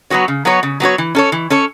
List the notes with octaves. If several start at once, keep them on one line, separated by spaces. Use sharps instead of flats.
F#3 B3 F#4 C#5
C#3
F#3 B3 F#4 C#5
C#3
F#3 B3 F#4 C#5
E3
C#4 A4 C#5
E3
C#4 A4 C#5